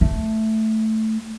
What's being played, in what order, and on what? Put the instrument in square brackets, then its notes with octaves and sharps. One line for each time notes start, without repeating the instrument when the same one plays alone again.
[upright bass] A3